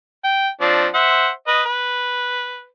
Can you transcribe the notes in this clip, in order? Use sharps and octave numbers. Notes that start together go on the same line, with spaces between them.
G5
F3 C4 D4
C5 E5 F#5
B4 D#5
B4